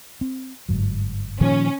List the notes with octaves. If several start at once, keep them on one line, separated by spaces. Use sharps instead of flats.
C4
G1 G#2 F#3
A#2 D#3 F3 C#4